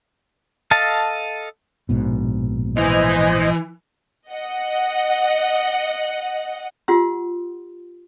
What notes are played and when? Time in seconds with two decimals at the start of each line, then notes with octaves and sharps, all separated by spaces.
0.71 A4 D#5 F5 A5
1.89 A#1 G#2 B2
2.77 E3 C5 D#5 G#5
4.30 D#5 F#5
6.88 F4 G4 F#5 C6 E6